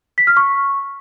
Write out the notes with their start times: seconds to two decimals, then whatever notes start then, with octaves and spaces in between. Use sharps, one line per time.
0.18 B6
0.27 F6
0.37 C#6